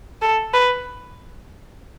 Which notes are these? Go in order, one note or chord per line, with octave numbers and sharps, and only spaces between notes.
A4
B4